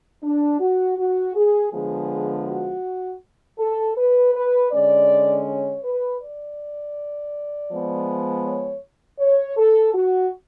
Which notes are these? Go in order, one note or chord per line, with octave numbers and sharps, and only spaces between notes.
D4
F#4
F#4
G#4
D3 F3 G#3 B3 G#4
F#4
A4
B4
B4
D3 G#3 C#4 D5
C#5
B4
D5
F3 G#3 B3
C#5
C#5
A4
F#4